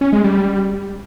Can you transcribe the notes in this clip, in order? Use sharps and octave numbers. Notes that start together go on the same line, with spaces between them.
C#4
G#3
G3